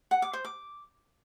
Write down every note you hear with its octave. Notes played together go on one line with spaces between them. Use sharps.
F#5
D6
C5
D6